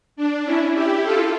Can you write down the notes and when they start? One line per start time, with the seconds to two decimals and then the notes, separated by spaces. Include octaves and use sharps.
0.16 D4
0.45 C#4 E4
0.74 E4 G4
1.03 F4 A4